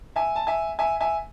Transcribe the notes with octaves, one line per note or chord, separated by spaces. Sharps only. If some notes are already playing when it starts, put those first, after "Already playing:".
E5 G#5
A5
E5 G#5
E5 G#5
E5 G#5